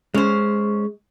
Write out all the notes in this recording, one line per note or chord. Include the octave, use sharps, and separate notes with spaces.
G#3 C#4 C5